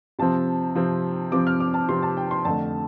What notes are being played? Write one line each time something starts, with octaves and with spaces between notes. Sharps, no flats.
C3 F3 C4 A5
C3 F3 C4
C3 F3 C4 D6
F6
D6
A5
C3 F3 C4 C6
A5
G5
C6
F2 D3 A3 A5